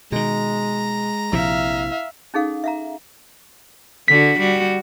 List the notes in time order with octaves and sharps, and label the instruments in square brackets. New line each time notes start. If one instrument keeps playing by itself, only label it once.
[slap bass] B2 D#3 [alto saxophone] G#3 [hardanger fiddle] A#5
[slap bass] A#1 C3 F3 [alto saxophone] E4 [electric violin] E5 F5
[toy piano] C#4 D#4 G#4 A4 F5
E5 F5 A#5
[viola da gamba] D3 F#4 [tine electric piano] B6
[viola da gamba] G3 F#4